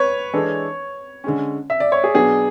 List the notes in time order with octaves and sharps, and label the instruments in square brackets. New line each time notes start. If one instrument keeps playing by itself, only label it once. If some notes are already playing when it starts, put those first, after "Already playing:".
Already playing: [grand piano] B4 C#5
[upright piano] E3 G#3 D4 A4
D3 G#3 C#4
[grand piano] E5
D5
C#5
G#4
[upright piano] B2 F#3 B3 D4 [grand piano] G#4